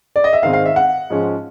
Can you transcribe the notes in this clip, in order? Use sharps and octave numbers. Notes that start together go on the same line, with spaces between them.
D5
D#5
E5
G#2 D#3 G#3 C4 F5
F5
E5
F#5
G#2 F3 G#3 C#4